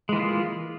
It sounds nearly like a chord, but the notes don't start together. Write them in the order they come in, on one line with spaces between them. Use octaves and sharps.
G#3 E3 A#3 F4